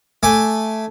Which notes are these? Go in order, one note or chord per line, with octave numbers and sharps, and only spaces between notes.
A3 G#5 D6